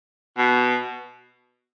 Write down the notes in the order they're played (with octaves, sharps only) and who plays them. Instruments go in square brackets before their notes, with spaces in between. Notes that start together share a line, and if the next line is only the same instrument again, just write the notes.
[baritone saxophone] B2